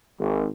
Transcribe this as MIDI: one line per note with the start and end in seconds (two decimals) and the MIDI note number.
0.19 0.45 32